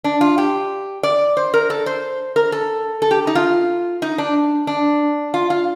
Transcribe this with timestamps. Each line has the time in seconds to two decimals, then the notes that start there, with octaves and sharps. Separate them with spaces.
0.04 D4
0.21 F4
0.38 G4
1.03 D5
1.37 C5
1.54 A#4
1.70 A4
1.86 C5
2.36 A#4
2.52 A4
3.02 A4
3.11 G4
3.27 D#4
3.35 F4
4.02 D#4
4.18 D4
4.67 D4
5.34 F4
5.50 F4